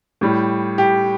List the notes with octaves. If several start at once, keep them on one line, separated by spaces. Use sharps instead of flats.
A2 G3
G4